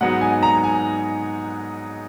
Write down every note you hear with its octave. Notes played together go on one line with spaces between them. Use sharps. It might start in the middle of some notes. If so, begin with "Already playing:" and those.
G#2 F#3 B3 D#4 F#5
G#5
A#5
G#5